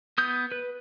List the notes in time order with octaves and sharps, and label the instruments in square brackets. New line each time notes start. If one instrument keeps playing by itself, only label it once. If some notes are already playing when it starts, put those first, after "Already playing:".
[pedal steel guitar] B3 D#6 G6
B4